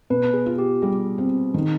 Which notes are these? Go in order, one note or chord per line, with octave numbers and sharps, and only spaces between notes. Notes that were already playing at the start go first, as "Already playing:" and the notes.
B2 B4
G#4
F4
G4
G3 G#4
C4
D#3